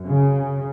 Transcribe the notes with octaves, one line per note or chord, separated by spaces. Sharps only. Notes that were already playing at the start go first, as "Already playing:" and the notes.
Already playing: F#2
C#3